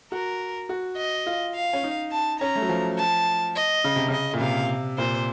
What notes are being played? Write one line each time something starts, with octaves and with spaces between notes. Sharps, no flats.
F#4 A#4
F#4
D#5
F4
F5
C#4
D#4
A5
C#4 A#5
A3
F#3
F3
A5
D#5
C#3
C3
C#3 D#5
A#2
C3 F5
A#2 C5